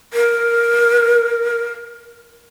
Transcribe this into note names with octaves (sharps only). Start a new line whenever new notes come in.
A#4